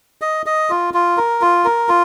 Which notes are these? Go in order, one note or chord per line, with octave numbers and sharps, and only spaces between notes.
D#5
D#5
F4
F4
A#4
F4
A#4
F4